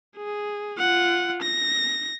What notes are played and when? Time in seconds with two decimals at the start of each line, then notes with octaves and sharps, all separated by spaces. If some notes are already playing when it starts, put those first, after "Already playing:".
0.17 G#4
0.78 F4 F#5
1.42 A#6